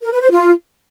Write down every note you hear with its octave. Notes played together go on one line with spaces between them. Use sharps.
A#4
B4
C5
F4